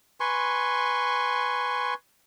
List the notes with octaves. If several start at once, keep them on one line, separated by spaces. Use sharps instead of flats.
B4 G#5 C6 C#6